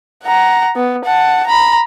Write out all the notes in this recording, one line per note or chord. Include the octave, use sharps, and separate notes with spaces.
F#5 A#5
B3
F#5 A5
A#5 B5